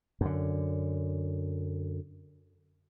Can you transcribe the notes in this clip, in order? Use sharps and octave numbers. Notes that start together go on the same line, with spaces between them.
F#2 D3